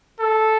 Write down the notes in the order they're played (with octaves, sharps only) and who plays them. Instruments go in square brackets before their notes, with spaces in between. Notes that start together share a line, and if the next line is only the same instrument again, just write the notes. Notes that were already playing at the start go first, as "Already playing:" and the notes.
[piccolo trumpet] A4